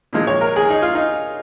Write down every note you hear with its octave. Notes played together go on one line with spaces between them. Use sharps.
A#2 F3 G#3
C#5
A#4
G#4
D#4
F4
D#4